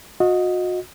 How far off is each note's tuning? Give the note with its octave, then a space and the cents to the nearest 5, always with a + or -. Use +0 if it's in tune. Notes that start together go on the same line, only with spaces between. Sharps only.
F#4 -35 D#5 +5